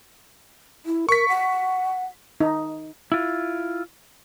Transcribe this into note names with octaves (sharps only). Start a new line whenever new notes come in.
E4
A#4 C#6 B6
F#5
D#4
E4 F4